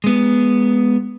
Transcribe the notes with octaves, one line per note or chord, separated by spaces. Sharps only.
G#3 B3